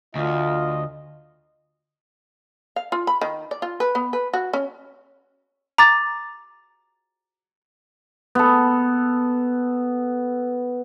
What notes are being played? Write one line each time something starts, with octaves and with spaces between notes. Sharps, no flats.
D2 F4 D#5
F5
F4
B5
D#3
D5
F4
B4
B3
B4
F#4
C#4
A#5 D6 A6
B3 A4